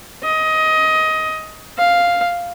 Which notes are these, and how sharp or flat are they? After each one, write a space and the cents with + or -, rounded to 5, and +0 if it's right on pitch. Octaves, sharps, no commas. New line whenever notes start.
D#5 +20
F5 +0